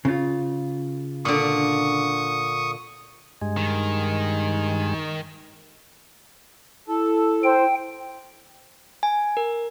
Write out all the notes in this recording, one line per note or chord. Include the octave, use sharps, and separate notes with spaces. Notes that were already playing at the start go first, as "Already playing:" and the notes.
C#3 F4
A#2 D3 C#6 D#6
G2 G#3
D#3
E4 A4
C5 G5
G#5
A#4